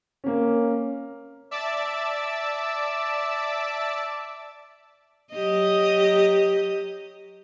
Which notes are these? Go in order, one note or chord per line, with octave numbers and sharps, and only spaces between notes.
A#3 C#4
D5 E5 A5 D6 E6
F#3 G4 D#5